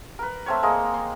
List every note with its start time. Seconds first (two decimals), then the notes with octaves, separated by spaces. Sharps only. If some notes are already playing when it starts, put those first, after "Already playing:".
0.19 A#4 B4
0.46 A3 C4 C#5
0.63 G#3 A#3 D#5
0.94 C6